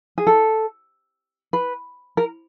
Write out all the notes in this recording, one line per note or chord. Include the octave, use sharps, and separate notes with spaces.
G#4
A4
B4
A#4